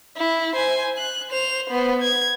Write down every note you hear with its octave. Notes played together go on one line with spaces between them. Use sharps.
E4
C5 G#5
F#6
C5 F7
B3 C5
G#6